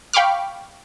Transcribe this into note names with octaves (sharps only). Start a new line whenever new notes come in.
F5 G5 B5 C#6 D6 F6